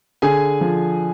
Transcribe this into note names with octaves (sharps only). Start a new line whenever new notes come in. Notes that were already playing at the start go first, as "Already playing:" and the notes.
D3 G#4 G#5
F3